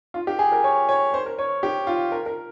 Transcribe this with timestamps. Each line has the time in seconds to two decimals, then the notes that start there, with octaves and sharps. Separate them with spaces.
0.14 F4
0.27 G4
0.39 G#4
0.52 A#4
0.64 C#5
0.89 C#5
1.14 C5
1.26 A#4
1.39 C#5
1.63 G4
1.87 F4
2.12 A#4
2.26 A#4